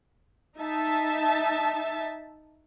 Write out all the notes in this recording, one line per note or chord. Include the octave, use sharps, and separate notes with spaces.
D#4 E5 A5